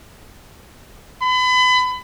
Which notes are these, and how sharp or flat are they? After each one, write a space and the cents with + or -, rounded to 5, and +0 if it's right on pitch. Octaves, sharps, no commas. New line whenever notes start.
B5 +30